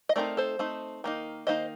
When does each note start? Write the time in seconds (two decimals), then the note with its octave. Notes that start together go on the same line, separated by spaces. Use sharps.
0.09 D#5
0.16 A3 C4 D#4 A#4 D5
0.37 A4 C5
0.59 A3 C4 D#4
1.04 D#3 A#3 D#4
1.47 D#3 A#3 D#4 C5 D#5